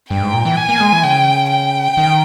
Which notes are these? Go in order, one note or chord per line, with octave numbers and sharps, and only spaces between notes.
G2 G5
G#2
A#2
E3
G#5
A#3
G#3
E3
C#3 G5
G5
D#3